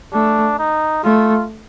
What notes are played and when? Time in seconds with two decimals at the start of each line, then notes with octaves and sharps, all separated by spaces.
0.13 A3 D4
0.59 D#4
1.04 A3 F4